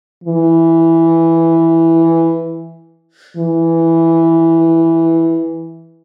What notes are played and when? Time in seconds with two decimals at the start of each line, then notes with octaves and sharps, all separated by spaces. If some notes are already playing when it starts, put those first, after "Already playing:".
0.24 E3
3.37 E3